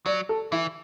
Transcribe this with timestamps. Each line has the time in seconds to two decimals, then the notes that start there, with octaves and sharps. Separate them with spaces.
0.06 F#3 D5
0.29 A4
0.52 E3 E4